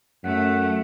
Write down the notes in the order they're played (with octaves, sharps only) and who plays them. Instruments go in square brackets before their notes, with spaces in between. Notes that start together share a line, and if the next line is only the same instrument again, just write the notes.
[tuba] F#2 [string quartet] A3 [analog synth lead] F#5